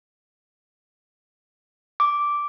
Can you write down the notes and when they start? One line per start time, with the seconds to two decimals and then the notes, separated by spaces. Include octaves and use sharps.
2.00 D6